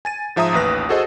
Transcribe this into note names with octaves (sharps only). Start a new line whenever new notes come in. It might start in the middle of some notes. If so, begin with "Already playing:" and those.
G#5 A6 D#7
G#2 F3 E5 A#5 D#6
A1 D#2 B4 A#6
F#4 G#4 A4 C5 D#5